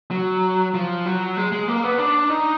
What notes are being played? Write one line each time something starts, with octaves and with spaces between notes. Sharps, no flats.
F#3
F3
F#3
G#3
G#3
A#3
B3
D4
D#4